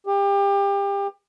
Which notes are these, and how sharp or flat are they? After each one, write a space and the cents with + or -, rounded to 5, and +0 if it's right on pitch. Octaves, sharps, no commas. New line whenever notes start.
G4 +30